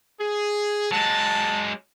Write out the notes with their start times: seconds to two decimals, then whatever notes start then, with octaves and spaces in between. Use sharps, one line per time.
0.20 G#4
0.91 F#3 G#3 A5